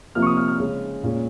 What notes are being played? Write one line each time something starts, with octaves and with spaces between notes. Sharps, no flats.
C3 F3 A#3 F6
C#6
D#6
F6
F6
C#3 G#3 C#4
A#2 G#3 C#4